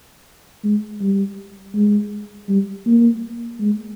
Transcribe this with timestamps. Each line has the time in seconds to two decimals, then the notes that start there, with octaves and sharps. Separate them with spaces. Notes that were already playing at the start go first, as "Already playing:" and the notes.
0.64 G#3
1.01 G3
1.75 G#3
2.49 G3
2.87 A#3
3.60 G#3